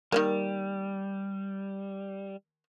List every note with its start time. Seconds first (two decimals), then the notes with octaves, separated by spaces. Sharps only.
0.12 D#3 G3 G#3 A#3